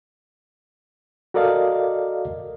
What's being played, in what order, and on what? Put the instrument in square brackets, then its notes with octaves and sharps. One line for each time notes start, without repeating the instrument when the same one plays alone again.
[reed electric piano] F#4 A4 A#4 D5 D#5 F5